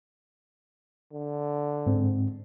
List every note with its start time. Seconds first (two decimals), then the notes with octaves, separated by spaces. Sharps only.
1.12 D3
1.86 G#2 C4